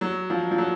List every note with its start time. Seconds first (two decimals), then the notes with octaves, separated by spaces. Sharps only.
0.01 F#3
0.30 F3
0.51 F3
0.58 F#3